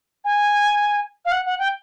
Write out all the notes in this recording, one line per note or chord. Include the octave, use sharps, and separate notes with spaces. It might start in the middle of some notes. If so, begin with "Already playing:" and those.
G#5
F5
F#5
F#5
G5